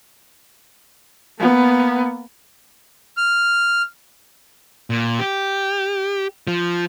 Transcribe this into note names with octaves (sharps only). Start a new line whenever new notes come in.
A#3 B3
F6
A#2
G4
F3